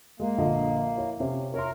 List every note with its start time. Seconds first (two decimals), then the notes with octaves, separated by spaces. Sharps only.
0.20 G#3 A#3
0.38 A#1 D3 D#5
0.98 E4 C#5
1.20 C3 C#4
1.54 A#4 C#5 E5 C6